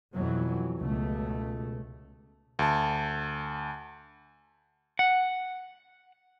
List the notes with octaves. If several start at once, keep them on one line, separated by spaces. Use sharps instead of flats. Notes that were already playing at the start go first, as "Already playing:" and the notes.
F2 B2 E3 F#3
C#2 B2 A3
D2 A5
F#5